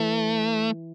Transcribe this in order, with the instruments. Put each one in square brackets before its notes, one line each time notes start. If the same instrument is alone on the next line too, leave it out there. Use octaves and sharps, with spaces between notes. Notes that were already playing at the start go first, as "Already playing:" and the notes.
Already playing: [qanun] E3 [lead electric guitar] A3